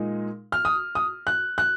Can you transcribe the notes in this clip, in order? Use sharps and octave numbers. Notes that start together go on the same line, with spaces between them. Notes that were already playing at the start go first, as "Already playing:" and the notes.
Already playing: A#2 G#3 D#4
F6
D#6
D#6
F#6
F#6